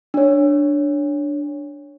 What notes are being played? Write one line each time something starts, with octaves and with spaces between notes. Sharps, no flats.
D4 C#5